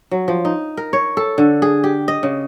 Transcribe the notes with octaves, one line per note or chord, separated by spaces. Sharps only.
F#3
F3
D#4
A#4
C#5
A4
D3
G#4
G4
D#5
C#3